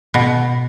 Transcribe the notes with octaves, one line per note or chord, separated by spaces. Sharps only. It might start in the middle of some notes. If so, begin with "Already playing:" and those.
B2